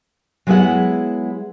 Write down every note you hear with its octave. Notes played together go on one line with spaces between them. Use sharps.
F#3 G#3 B3 E4 G#4 F#5